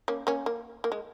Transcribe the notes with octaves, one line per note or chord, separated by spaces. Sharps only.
A#3 C#4
A#3 C#4
A#3
A#3
G#3